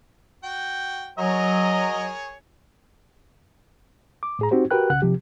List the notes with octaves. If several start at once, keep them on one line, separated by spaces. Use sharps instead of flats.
F#4 G5
F#3 G#4 A#4 C#5 D#5
D6
A2 G#4 A#5
C4 D#4 F#4 G4 C5
F#4 G4 A#4 B4 G5 F#6
C2 C#3 F#5 F#6
C3 F3 G4